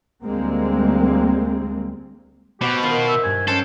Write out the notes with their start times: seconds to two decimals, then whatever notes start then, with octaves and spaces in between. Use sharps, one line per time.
0.23 D2 G3 G#3 A#3 C4
2.61 B2 G4 C5 F#5
2.83 D#3 F4
3.08 A#4 C5 D#5 E5
3.24 G2 G#5 F#6
3.48 F#3 C4 C#4 A4 C5